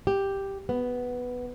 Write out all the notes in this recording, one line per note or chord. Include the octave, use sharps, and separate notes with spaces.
G4
B3